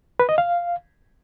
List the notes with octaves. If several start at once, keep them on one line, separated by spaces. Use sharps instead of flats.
B4
D#5
F5